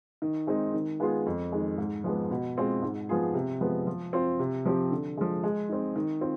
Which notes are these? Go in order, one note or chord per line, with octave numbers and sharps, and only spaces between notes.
D#3
G#3 C4 D#4
D#3
G#3 B3 F4 G#4
F2
D#3 G#3
G#2
F3 G#3 B3
B2
G#3 C4 F4
G#2
F3 B3 F4 G#4
C3
F3 G#3 B3
F3
C4 F4 C5
C3
F3 C4 G4
D3
F3 G#3
G#3
C4 D#4
D#3
C4 F4